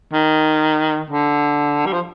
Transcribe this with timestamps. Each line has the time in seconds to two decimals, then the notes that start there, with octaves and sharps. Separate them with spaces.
0.13 D#3
1.10 D3
1.86 G3
1.93 F3